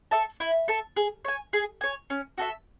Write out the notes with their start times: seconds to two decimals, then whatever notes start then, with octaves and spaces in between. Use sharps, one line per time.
0.11 A4 E5 A5
0.40 E4
0.68 A4 E5 A5
0.96 G#4
1.25 C#5 G#5
1.53 G#4
1.81 C#5 G#5
2.10 C#4
2.38 F#4 A4 E5